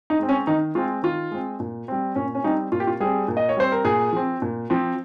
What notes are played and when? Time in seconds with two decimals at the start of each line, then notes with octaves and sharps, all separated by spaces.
0.10 D#4
0.19 G#3 C4
0.29 C#4
0.47 D#3 D#4
0.75 G#3 C4 F4
1.03 D#3 F4
1.31 G#3 C4
1.60 A#2
1.88 G3 C4
2.15 A#2 C#4
2.35 C#4
2.44 G3 C4 D#4
2.72 A#2 F4
2.80 G4
2.87 F4
3.00 G3 C4 G#4
3.28 A#2
3.37 D#5
3.49 C#5
3.57 G3 C4 C5
3.72 A#4
3.84 A#2 G#4
4.12 F3 C4
4.42 A#2
4.70 F3 C4